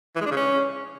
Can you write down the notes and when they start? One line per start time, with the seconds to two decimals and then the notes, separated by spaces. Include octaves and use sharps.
0.16 E3
0.21 G#3
0.26 D4
0.31 C#3
0.37 C#4